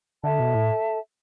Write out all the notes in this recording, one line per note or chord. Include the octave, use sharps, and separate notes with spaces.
D3 A4 E5 A5
B2
A2